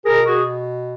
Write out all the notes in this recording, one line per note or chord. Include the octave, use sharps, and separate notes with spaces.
B2 G#4 A#4
F#4 G#4